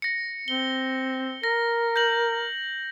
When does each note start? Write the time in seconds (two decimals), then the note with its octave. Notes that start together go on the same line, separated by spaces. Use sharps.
0.02 A#6 C#7
0.48 C4 G7
1.43 A#4 A#6
1.96 G6 A#6 F#7